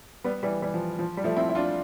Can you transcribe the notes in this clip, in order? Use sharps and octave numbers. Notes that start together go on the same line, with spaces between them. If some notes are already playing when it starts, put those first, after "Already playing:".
G3 B3
E3 G3
E3 G3
F3
F3
G3
F3 A3
C4 E4
E4
D4 F4